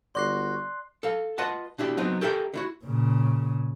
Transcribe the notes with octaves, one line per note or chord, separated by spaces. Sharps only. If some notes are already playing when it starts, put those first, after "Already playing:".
G1 F#4 D5 C6 D6 F#6 A#6 C7
A4 F5
F4 B4 D#5 F#5 A5
B2 D4 E4 G4
F#3 B3 C4 D#4
G4 A4 A#4 E5 F#5 G5
D3 E4 F#4
A#2 C#3